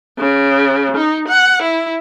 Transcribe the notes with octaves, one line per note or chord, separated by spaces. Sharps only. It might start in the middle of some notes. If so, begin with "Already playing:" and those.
C#3
D#4
F#5
E4